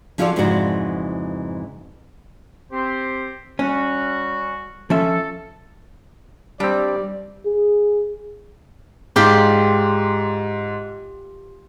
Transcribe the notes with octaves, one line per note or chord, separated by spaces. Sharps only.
F3 C#4 F4 F#4 A4 D5
F2 G#2 C#3 E3 F#4 D5
C4 G4 C5
G3 C#4 F#4
F3 C#4 A4 E5
G3 C4 D4 D5
G#4
G#2 F4 G4 D5